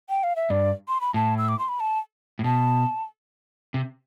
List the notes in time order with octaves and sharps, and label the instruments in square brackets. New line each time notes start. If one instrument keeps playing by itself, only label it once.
[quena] G5
F5
E5
[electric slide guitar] G2 [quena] D5
[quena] C6
B5
[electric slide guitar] A2 [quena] A5
[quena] E6
D6
C6
B5
A5
[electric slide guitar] A2
[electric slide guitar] B2 [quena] A5
[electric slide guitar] C3